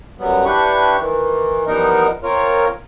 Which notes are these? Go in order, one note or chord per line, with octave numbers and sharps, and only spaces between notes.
F#2 F#3 G3 B3
D4 E4 G4 B4 C#6
D#3 E3
E3 F3 G3 B3 D#4 A#4
C4 F4 A#4 C#5